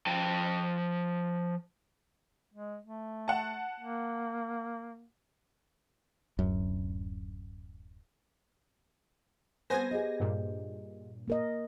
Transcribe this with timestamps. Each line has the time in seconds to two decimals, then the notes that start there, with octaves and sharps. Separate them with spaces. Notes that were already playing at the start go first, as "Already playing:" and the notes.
0.06 F3 G5 A5
2.54 G#3
2.83 A3
3.28 F#5 A5
3.80 A#3
6.39 D1 F#2
9.70 G3 B3 C4 A4 C5 G#5 A#6
9.91 G4 G#4 D#5
10.20 G2 A#2
11.28 A#3 A#4 D#5